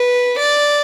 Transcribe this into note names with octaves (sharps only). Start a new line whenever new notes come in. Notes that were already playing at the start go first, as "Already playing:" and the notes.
Already playing: B4
D5